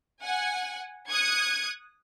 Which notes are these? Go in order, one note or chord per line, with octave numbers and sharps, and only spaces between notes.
F#5 G#5
D#6 F#6 G#6 C#7